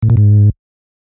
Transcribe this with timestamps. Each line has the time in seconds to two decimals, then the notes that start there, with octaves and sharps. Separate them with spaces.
0.02 A2
0.10 A#2
0.17 G#2